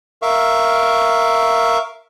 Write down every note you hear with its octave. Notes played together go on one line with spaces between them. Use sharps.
A#4 E5 F5 C#6